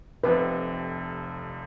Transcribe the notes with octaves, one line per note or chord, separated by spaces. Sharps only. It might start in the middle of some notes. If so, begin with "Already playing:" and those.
F1 F2 C3 B4